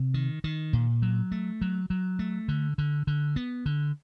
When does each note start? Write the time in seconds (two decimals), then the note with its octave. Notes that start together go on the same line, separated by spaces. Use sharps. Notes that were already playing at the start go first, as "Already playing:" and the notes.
Already playing: C3
0.14 D#3
0.44 D#3
0.73 A#2
1.02 F#3
1.32 A3
1.61 F#3
1.90 F#3
2.19 A3
2.48 D3
2.78 D3
3.07 D3
3.36 B3
3.66 D3